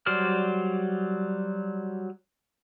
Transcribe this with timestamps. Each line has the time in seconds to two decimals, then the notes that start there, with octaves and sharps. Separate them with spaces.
0.06 F#3 G3 C5 D5 F6